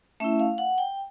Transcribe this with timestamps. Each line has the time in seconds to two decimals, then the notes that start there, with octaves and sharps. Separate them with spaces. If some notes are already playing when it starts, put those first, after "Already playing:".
0.20 A3 C#4 E4 E5
0.40 F5
0.58 F#5
0.78 G5